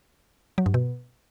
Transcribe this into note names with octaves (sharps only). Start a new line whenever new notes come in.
F#3
G2
B2